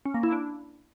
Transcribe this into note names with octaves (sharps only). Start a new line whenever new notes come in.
C#4
A#3
E4
D4